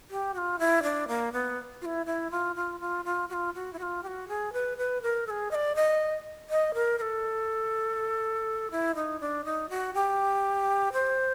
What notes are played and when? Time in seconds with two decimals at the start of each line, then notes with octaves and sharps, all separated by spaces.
0.10 G4
0.34 F#4
0.38 F4
0.59 E4
0.83 D4
1.08 A#3
1.33 B3
1.82 F4
1.85 E4
2.06 E4
2.31 F4
2.56 F4
2.80 F4
3.05 F4
3.29 F#4
3.33 F4
3.54 F#4
3.73 E4
3.79 F#4
3.83 F4
4.03 G4
4.07 F#4
4.28 G#4
4.53 B4
4.78 B4
5.02 A#4
5.27 A4
5.30 G#4
5.51 D#5
5.55 D5
5.76 D#5
6.50 D#5
6.74 A#4
6.98 A#4
7.01 A4
8.71 E4
8.95 D#4
9.20 D4
9.45 D#4
9.70 F#4
9.94 G4
10.93 C5